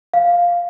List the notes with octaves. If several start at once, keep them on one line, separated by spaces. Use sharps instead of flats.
F5